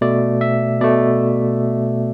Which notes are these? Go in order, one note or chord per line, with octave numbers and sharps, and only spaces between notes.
B2 A3 D5
E5
B2 A3 D5